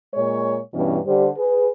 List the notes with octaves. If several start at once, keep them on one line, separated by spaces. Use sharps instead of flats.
A#2 G#3 C#5
G2 B2 E3 C#4
D3 G3 G4 C5
G#4 B4